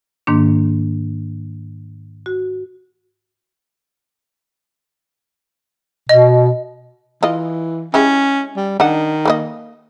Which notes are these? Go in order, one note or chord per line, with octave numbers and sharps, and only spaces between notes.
G#2 D#3 A#3 D4
F#4
B2 D#5
E3 F4 D#5
G#3 C#4 E4 G4
G3
D#3 D4 D#5 F#5
A#3 B4 D#5